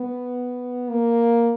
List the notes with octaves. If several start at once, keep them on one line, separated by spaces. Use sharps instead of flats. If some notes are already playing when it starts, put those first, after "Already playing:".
Already playing: B3
A#3